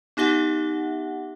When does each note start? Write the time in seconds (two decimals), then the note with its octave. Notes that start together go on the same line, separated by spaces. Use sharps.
0.17 B3 D#4 G4 E5 F#5